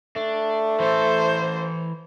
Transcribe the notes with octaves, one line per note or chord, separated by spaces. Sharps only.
A3 D4
E3 A4 C5